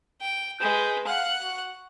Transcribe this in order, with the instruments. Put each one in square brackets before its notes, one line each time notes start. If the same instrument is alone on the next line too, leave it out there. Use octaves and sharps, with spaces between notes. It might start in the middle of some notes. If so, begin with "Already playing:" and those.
[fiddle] G5
[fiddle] G#3 B4 [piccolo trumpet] G6
[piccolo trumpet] F5 [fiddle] F#5 F#6
[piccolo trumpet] F#4